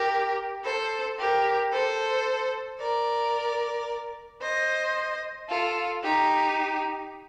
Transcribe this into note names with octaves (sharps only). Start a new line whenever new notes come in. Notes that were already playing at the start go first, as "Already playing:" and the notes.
Already playing: G4 A#4
A4 C5
G4 A#4
A4 C5
A#4 D5
C5 D#5
F4 A4
D#4 G4